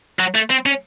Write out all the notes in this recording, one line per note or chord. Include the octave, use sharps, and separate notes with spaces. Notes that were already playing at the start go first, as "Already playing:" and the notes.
F#3
A3
C4
C#4